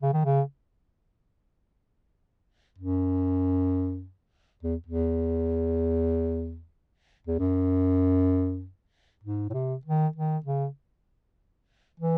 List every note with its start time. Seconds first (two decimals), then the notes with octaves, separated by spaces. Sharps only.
0.02 C#3
0.13 D#3
0.25 C#3
2.78 F#2
4.63 E2
4.86 E2
7.27 E2
7.39 F#2
9.24 G#2
9.50 A2
9.54 C3
9.85 D#3
10.16 D#3
10.46 C#3
12.00 E3